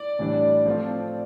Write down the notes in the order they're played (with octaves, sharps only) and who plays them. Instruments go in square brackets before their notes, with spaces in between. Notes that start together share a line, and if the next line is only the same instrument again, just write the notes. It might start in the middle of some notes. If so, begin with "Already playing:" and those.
Already playing: [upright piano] D5
[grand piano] A2 E3 G3 D4
F3 A3 C4 F4